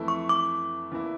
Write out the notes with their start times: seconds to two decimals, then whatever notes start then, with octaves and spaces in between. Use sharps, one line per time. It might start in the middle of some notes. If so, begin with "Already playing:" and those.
Already playing: F2 E3 A3 E4
0.08 C#6
0.29 D6
0.92 E2 E3 A#3 E4